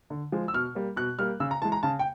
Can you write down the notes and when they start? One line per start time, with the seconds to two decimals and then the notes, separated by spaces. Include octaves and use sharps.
0.10 D3
0.32 F3 G#3
0.48 E6
0.54 B2 F6
0.75 G3 A#3
0.97 B2 F#6
1.19 G3 A#3 F6
1.40 C#3 E6
1.51 A#5
1.62 E3 G#3 A5
1.72 A#5
1.83 C#3 A5
1.99 G5